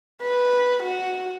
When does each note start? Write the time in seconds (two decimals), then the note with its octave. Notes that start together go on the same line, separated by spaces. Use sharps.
0.22 B4
0.83 F#4